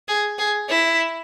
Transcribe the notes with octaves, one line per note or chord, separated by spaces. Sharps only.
G#4
G#4
E4